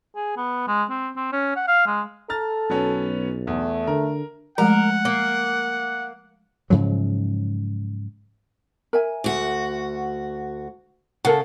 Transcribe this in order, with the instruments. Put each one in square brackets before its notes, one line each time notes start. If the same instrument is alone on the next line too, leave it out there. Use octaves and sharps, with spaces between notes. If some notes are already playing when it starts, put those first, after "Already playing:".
[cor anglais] G#4
B3
G#3
C4
C4
C#4
F#5
F5
G#3
[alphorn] A4 [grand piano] A#5 F6 A6
[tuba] B1 [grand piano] F#3 B3 C#4
[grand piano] E2 [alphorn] A3
[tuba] D3 [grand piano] A#4
[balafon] F3 G#3 A3 [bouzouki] A#4 [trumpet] F#5
[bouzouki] A#3
[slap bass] G#2 C#3 F3 F#3
[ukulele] A#4 E5 G#5
[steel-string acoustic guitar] D2 F#4
[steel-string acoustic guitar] C#3 [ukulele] A4 A#4 F#5